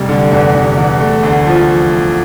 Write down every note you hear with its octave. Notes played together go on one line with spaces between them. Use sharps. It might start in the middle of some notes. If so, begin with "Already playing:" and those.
Already playing: F1 G3
D3
E2
E2
E2
A3
D2
F3